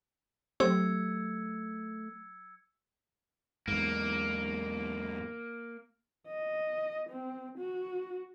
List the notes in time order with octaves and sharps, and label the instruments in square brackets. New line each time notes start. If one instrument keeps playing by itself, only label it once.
[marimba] F#3 G4 [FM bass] A3 [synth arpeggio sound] C4 [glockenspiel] E6 G#6 C#7
[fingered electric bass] E2 G#2 [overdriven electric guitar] A#3
[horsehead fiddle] D#5
C4
F#4